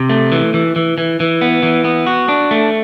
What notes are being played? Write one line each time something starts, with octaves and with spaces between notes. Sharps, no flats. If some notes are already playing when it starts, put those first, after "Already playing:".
Already playing: C3
A3
E3
E3
E3
E3
E3
B3
E3
B3
F#4
D4
A3